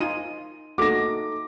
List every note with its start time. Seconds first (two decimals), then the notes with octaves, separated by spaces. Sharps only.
0.01 D#4 F4 G#5 D#7
0.78 A3 A#3 D#4 F#4 A4 D6 A#6